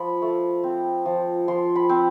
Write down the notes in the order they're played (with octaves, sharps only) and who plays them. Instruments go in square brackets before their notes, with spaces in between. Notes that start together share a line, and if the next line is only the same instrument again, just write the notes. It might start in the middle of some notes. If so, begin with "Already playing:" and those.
Already playing: [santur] F3 B5
A3
C4
F3
F3 C6
B5
C4